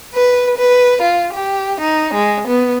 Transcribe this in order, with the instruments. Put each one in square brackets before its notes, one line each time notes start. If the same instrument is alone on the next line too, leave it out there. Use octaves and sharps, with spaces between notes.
[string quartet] B4
B4
F4
G4
D#4
G#3
B3